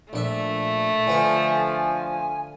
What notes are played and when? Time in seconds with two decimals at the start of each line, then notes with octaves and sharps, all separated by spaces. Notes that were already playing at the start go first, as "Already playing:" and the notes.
0.13 A#1 A3 D4 E5
1.07 D3 F3 B4 F#5 G#5